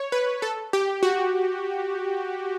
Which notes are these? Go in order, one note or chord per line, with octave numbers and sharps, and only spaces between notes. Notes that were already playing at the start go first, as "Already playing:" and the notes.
Already playing: C#5
B4
A4
G4
F#4